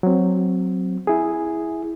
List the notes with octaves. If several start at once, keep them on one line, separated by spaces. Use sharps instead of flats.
F#3 C4
E4 G#4